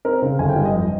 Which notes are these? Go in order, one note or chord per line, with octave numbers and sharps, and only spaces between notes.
C4 A#4
C#3 C5
G1 G#5
G5
G2 F5
D#5
F2